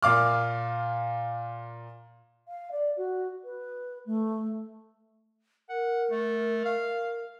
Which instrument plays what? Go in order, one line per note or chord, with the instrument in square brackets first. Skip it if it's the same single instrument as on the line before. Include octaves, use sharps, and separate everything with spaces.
[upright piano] A#2 F5 D6 F6
[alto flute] F5
D5
F#4
B4
A3
[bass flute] A#4 [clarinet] F#5
[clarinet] A3
F5